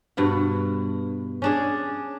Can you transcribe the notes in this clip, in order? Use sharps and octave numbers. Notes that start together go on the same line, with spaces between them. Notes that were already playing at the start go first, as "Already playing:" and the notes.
G2 B2 F#5
C#4 D4 G#4